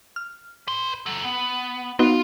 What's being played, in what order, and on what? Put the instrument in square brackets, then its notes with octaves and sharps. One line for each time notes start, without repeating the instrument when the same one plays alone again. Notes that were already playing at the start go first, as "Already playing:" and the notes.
[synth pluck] F6
[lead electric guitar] B4 C6
F#3 A4
B3
[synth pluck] B3 D#4 F#4 [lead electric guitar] F4 F5